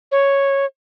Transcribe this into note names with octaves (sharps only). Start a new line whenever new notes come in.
C#5